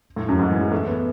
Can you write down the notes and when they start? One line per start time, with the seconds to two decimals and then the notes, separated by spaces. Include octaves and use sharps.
0.16 A2
0.29 F#2
0.39 G#2
0.51 E3
0.61 G#3
0.72 A3
0.88 B3